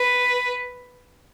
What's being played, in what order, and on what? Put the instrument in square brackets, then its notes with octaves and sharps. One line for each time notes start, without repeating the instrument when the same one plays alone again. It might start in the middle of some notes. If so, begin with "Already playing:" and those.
Already playing: [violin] B4